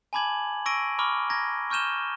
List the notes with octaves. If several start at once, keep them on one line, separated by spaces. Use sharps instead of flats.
G#5 A5 B5 D6 G#6 F#7
C#6 E6 A#6 D7 D#7
A#5 B5 C#6 D6 F6 G7
A#5 G#6 A#6
C#6 F6 G6 D#7 E7 G7